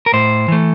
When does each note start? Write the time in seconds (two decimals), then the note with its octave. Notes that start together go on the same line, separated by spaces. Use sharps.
0.06 A#4
0.13 A2 C5
0.48 E3 A3